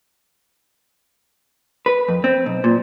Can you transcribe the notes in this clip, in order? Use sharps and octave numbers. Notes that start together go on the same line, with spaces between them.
B4
F2
C4
B1
A#2